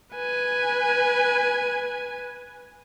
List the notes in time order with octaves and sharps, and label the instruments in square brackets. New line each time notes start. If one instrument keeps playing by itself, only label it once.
[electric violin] B4 G#5